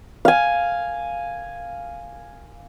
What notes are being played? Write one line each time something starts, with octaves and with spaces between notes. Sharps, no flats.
F5 G#5